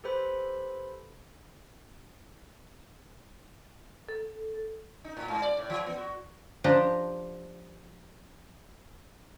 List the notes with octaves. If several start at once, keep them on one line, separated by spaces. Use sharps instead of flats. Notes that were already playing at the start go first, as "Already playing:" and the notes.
G4 A4 B4 C5 B5
A4
D#4
A2
G#2
D5
A2
E3
B3
F#4
F3 D4 G4 A#5